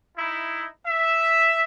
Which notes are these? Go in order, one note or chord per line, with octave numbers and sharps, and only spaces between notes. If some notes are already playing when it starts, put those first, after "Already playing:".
D#4 E4
E5